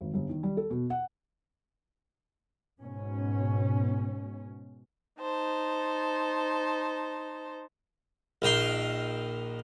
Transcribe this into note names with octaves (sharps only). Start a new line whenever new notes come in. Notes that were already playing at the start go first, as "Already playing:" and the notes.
G#1
G1
D#3
G3
A4
B2
F#5
G#2 B2 C#4
D#4 C5 A5
A#1 D#3 G5 C6